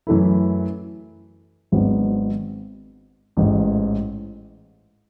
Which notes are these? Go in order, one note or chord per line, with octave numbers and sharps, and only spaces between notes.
F#2 E3 A3 E4
G#1 G#2 F#3 B3 D4
A1 G#2 E3